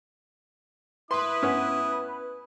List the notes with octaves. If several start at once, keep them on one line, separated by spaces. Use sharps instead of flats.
E4 B4 C6 D#6
B3 C#4